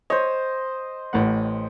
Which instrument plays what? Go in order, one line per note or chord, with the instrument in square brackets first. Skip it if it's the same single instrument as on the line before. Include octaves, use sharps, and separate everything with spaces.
[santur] C5 D#5 [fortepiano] C#5
[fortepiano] A1 A2 F#5